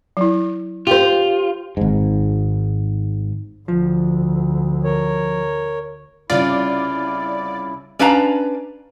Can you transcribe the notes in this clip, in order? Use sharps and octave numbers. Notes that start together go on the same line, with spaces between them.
F#3 E4
F4 G4 C5
G#1 G#2
D2 F3
A#4 C#5
C2 C#3 E4 F4 D5
C#4 D4 B4 F5 A5 A#5